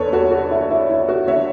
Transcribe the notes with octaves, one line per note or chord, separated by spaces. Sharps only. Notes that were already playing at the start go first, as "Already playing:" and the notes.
Already playing: E2 D3 A4 B4 C#5 D5
F#4 A4
F#4
E4
E4
E4
F#4
D3 C#5 E5